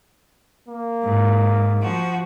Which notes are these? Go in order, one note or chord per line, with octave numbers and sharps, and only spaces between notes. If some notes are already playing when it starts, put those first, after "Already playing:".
A#3
G#2
F3 F#4